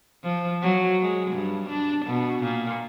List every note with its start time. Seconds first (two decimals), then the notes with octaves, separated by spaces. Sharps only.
0.24 F3
0.63 F#3
1.01 G#3
1.31 G2
1.69 D4
2.05 B2
2.43 A#2